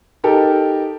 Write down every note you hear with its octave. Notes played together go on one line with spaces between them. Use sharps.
D#4 G4 A4 A#4